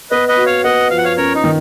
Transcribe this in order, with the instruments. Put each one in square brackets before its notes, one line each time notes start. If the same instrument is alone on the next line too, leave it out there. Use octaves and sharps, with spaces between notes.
[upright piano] B3 [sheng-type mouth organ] B4 D#5
[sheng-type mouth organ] B4 D#5
[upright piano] F#4
[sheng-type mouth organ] C#5 F5
[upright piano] B3 [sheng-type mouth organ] D#5 F#5
[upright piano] F3 [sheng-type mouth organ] F5
[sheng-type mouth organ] F#5
C#5 F5
[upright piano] C#4 [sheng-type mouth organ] A#4 C#5
[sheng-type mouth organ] D#4
[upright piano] D#3